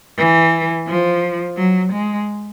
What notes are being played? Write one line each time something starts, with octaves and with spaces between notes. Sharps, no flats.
E3
F3
F#3
G#3